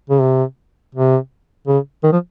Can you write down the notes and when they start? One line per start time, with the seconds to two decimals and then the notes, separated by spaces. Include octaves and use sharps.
0.10 C#3
0.21 C3
0.95 C3
1.67 C#3
2.03 D#3
2.12 F3